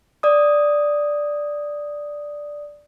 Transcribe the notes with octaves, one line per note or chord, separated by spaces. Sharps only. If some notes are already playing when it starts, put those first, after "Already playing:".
D5 D#6